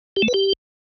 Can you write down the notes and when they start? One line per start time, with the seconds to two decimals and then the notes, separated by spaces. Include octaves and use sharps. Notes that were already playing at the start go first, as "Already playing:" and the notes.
0.17 G4
0.22 A3
0.28 B4
0.34 G4